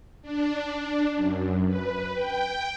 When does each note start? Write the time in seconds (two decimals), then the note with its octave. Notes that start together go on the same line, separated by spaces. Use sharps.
0.22 D4
1.16 F#2
1.67 B4
2.14 G5